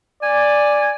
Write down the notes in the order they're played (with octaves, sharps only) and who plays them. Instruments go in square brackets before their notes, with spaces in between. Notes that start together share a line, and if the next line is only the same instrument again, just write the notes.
[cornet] D5 [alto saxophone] G#5